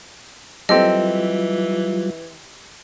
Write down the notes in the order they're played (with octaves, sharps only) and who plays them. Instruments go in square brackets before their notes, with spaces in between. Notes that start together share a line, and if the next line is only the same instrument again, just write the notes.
[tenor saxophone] E3 [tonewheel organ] F#3 G3 F4 [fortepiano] C4 G4 A4 [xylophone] D#5